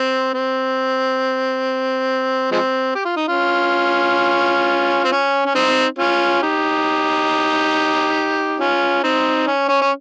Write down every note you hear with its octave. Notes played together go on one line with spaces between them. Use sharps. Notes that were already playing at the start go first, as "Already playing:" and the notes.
Already playing: C4
C4
F3 G#3 C4
G4
F4
D#4
C#4 F4
C4
C#4
C#4
C4 D#4
C#4 F4
D#4 G4
C#4 F4
C4 D#4
C#4
C#4
C#4